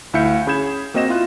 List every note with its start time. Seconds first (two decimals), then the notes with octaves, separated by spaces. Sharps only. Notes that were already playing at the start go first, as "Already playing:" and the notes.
0.13 D2 E4 E5 F5 G6 C#7
0.47 C#4 G#4 B5 G6 G#6 E7
0.94 A#3 C4 F#4 D#5 A#6 E7
1.09 E4 F4 F#6